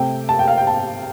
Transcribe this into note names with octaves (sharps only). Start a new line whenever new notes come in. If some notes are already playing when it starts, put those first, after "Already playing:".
Already playing: C3 A3 G5
A5
G5
F5
G5
A5